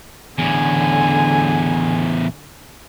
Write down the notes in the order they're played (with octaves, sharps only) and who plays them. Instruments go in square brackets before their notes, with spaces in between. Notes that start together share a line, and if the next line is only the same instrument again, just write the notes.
[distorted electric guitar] E2 A2 [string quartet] D3 G#5